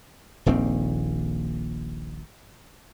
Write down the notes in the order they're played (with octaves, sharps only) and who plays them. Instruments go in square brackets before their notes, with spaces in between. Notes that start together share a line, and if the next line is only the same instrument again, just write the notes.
[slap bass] D#1 A#1 D#3 C4